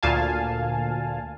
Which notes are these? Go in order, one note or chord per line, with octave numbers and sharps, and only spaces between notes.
D2 A#2 F5 G#5 A5